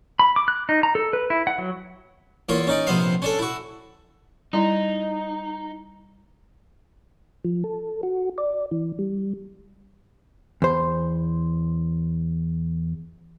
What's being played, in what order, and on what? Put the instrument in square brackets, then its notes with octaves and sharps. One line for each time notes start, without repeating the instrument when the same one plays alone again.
[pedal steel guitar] B5
D6
F#6
D#4
A#5
A4
B4
E4
F#5
F#3
[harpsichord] E2 A#3 F4 C#5
C#4 D#4 D5
A#1 C3 B3 C5 F5
C#4 D4 A4
E4 F#4
[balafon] G3 E4 [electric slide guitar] D#4
[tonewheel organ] F3
A4
F#4
D5
E3
G3
[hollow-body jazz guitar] E2 C5